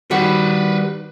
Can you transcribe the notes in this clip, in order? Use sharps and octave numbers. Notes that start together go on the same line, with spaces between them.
D#3 G3 B3 F#4 B4 C5